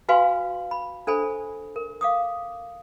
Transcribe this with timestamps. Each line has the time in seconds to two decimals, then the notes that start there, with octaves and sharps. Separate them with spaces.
0.09 F#4 B4 F5 G#5 C6
0.71 B5
1.07 D4 A4 C5 G#5 B5
1.76 A#4
2.01 F5 D6 D#6